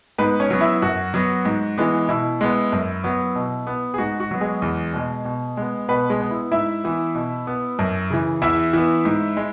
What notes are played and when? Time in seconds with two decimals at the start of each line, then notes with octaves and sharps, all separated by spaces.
0.18 G#2 B3 B4
0.40 C#4 C#5
0.50 F#3 B3
0.61 E4 E5
0.82 F#2 F#4
1.14 F#3 B3
1.45 G#2
1.77 E3 G#3 B3
2.09 B2 E4
2.41 G#3 B3
2.72 F#2
3.04 F#3 B3
3.35 B2
3.67 B3
3.94 G#4
3.98 G#2 F#4
4.20 F#4
4.31 F#3 B3
4.41 G#3 G#4
4.62 E2
4.94 B2 G#3
5.25 B2
5.57 G#3 B3
5.88 B2 B3 B4
6.10 G#3 G#4
6.20 B3
6.31 E4
6.51 G#2 E4 E5
6.84 E3 B3
7.15 B2
7.47 B3
7.79 F#2
8.10 C#3 E3
8.42 E2 E4 E5
8.73 E3 B3
9.05 G#2
9.37 G#3